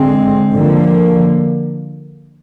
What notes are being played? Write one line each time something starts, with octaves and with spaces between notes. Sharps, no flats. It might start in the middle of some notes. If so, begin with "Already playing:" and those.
Already playing: D3 G#3 C4
D3 F3 A#3